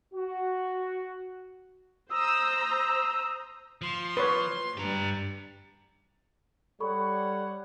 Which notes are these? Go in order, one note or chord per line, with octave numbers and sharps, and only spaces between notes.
F#4
C5 A#5 D#6 E6
F3 C6
B4 C#5
G2 G3 G4 A#5
G3 A4 C#5 F#5 B5 C#6